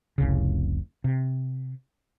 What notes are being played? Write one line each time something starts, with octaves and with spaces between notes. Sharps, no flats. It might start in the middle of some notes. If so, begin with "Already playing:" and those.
F1 C2 C#3
C3